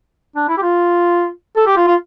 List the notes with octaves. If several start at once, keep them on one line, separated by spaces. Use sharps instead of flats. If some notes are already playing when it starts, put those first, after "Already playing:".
D4
E4
G4
F4
A4
G4
F4
F4